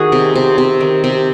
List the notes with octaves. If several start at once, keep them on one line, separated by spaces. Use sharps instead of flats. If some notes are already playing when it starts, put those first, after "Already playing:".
Already playing: D#3 F#4 G#4
C3
C3
C3
D#3
C3